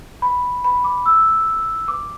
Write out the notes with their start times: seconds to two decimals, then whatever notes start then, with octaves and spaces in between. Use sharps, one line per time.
0.22 B5
0.64 B5
0.84 D6
1.06 E6
1.88 D6